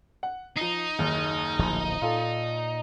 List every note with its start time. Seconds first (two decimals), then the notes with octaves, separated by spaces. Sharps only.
0.23 F#5
0.57 F3 D#4 C7
0.99 F#1 D#2
1.59 D1 A#1 F3
2.02 A#2 F4 A4